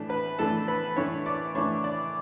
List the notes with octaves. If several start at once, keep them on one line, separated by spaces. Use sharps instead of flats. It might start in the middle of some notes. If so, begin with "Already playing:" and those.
Already playing: A2 E3 A3 D4
B4 B5
A2 E3 A3 D4 A4 A5
B4 B5
A2 E3 A3 D4 C#5 C#6
D5 D6
A2 E3 A3 D4 C#5 C#6
D5 D6